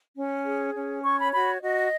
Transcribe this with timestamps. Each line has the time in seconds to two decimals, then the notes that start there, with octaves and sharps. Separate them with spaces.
0.16 C#4
0.45 G#4
0.74 C#4
1.03 C#5 C#6
1.18 B5
1.33 F#4 B5
1.62 F#4 D#5